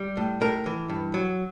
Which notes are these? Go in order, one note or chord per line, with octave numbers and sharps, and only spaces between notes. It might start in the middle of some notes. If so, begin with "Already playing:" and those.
Already playing: G3
A2
A2 A#4
E3
G2
F#3